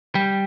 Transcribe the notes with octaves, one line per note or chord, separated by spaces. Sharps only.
G3